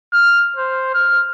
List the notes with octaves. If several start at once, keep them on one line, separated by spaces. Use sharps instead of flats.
F6
C5
F6